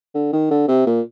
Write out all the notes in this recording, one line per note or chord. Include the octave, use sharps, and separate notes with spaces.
D3
D#3
D3
C3
A#2